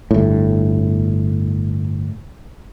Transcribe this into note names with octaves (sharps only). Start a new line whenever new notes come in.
G1 A2